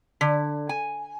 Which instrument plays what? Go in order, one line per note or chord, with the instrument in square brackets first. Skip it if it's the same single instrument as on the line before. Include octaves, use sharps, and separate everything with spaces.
[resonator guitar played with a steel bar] D3
G#5